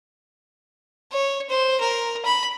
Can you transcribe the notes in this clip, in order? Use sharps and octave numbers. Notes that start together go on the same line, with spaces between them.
C#5
C5
A#4
B5